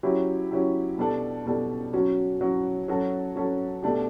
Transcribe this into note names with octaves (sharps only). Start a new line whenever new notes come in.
F#3 C#4 E4 G4
F#3 C#4 E4 G4
B2 G3 D4 A4
B2 G3 D4 A4
F#3 C#4 F#4
F#3 C#4 F#4
F#3 C#4 F#4 A4
F#3 C#4 F#4 A4
B2 A3 D4 G4